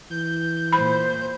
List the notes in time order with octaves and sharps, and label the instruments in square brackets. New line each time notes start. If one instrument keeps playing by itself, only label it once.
[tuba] E3 [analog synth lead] G6
[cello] A#2 C5 [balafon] B5